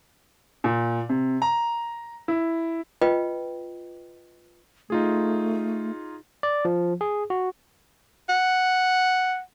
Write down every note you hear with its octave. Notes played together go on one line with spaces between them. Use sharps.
A#2
C3
A#5
E4
F4 B4 D#5 G5
A3 D#4 F4 G#4
D5
F3
G#4
F#4
F#5